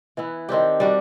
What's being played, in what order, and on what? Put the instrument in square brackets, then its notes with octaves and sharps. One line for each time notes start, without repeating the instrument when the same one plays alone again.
[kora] E3 B3 E4
D#3 C4 D4 G4
G3 D4 F#4